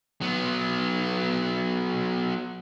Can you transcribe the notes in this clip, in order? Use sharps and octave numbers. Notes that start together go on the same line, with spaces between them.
F#3 B3